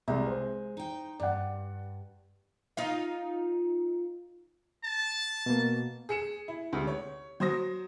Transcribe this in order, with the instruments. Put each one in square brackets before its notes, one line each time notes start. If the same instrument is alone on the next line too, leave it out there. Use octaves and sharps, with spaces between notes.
[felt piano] C2 [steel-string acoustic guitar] G#3
[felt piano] C5
[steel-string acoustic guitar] D#4 G5
[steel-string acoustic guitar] G2 [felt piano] D5 F#5
[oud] D#4 F4 F5
[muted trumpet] A5
[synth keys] B2 A#3
[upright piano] G#4 C#7 E7
E4
D2 C3 G#3
C#5
F#3 C5 D#6 A#6